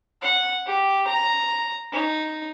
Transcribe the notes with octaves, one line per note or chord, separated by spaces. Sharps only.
F#5
G4
A#5
D#4